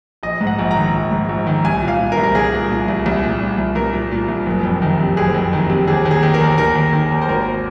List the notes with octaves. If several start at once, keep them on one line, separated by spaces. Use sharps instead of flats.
A#1 D#5
G#2
F#5
A#1
A#5
D#3
A#1
G#2
A#1
D#3
C2 G#5
A#2
F5
A#2
A#4
C2
A#4
C2 G#4
A#2
A#2
C2
C2
A#2
A#2
C2
C2 A#4
A#2
A#2
C2
F#1
F2
D#3
C3
F#1 G#4
F2
D#3
C3
D#2 G#4
D#3
G#4
D#3
A#4
D#2
D#2 A#4
D#3
D#3
D#2
C5
G#1 A#4